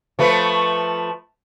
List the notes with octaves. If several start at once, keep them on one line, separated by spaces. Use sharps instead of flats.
F3 A3 B4